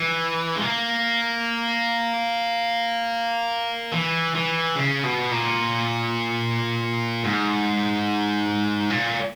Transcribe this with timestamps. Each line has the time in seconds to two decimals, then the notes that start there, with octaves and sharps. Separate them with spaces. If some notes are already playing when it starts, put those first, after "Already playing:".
Already playing: E3
0.56 G#3
0.62 A#3
3.93 E3
4.35 E3
4.75 C#3
5.04 B2
5.31 A#2
7.24 G#2
8.90 A#2